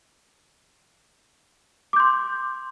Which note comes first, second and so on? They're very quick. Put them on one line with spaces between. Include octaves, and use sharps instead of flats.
D6 G6 C6